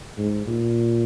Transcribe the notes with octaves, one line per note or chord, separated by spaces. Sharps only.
G#2
A#2